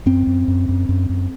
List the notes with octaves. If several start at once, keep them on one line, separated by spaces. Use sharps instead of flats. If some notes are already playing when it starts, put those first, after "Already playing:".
F#2 C4
F#2
F#2
F#2
F#2
F#2